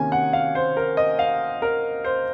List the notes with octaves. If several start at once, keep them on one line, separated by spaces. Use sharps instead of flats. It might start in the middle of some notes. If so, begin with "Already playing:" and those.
Already playing: C3 D#3 A#3 C#4 G#5
F#5
F5
C5
A#4
D#5
F5
A#4
C5